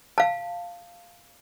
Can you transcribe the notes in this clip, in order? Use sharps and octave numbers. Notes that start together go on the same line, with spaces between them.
F5 A5